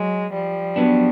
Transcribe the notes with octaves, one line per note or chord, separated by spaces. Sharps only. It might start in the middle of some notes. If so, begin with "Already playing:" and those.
Already playing: F#3 G#3
F3 G3
F#3 B3 D4